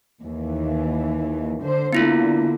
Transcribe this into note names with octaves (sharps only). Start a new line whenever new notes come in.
D#2 E3
D3 C5
D3 A#3 B3 E4 F4